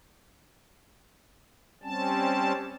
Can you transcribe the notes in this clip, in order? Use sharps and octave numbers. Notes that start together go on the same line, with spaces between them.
G3 C4 C#4 A5